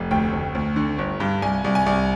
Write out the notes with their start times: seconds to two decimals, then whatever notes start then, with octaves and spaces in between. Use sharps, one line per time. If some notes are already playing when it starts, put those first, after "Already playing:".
Already playing: F1
0.11 D2 G5
0.33 D2
0.55 D2
0.76 D3
0.98 G1
1.20 G2
1.42 C2 G#5
1.64 C2
1.75 G#5
1.86 C2